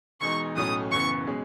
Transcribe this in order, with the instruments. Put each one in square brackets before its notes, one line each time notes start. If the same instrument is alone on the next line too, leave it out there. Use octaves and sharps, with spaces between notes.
[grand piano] E1 E2 B2 G#3 D#4 [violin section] C#6
[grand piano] B1 A2 F#3 C#4 [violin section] D#6
[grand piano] F#1 F#2 E3 B3 [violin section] C#6
[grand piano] B2 G#3 C#4 G#4